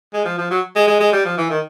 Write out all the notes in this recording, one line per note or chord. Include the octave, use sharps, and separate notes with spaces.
G#3
F3
F3
F#3
G#3
G#3
G#3
G3
F3
E3
D#3